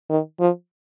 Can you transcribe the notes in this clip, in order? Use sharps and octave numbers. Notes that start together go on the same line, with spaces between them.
D#3
F3